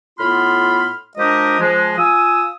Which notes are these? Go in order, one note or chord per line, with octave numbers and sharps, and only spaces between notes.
A2 B3 F4 B5 C6 F6
F3 G#3 D4 G4 A#4 D#5
F3 G#3
F4 G#5 D#6 E6